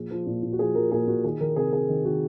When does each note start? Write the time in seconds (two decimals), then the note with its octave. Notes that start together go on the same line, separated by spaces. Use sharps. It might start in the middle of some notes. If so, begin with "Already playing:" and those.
Already playing: A#2 F3 G#4
0.11 F3
0.27 A#2
0.43 A#2
0.53 F#4
0.59 F3 G#4
0.75 F3 A#4
0.92 A#2 G#4
1.08 A#2 F#4
1.24 D#3 G#4
1.40 D#3 A#4
1.56 C3 G#4
1.73 C3 G#4
1.89 D#3
2.05 D#3 F#4